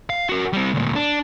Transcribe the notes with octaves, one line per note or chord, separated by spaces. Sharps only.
F5
F#4 A#4
G3 C4
D2 A#2
D4